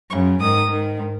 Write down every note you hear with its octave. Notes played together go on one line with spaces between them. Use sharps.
F#2 C#3 C#6
G#2 D#3 D#6
G#2 D#3